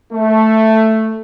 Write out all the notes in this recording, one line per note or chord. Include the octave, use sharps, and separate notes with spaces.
A3